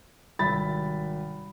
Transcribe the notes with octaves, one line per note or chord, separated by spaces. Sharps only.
G#1 C3 G3 E5 B5 A6